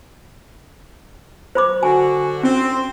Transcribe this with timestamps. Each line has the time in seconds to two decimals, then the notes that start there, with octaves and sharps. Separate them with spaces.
1.55 C5 B5 D6
1.83 D3 F#4 G#5
2.43 C4 C#4